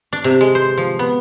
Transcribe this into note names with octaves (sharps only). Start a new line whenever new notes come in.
D4
C3
G#3
C5
F3
B3